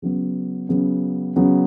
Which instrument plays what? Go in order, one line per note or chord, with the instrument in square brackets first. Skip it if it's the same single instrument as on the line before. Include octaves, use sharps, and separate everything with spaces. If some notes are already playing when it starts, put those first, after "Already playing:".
[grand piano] C#3 F#3 B3
C#3 F#3 B3
C#3 F#3 B3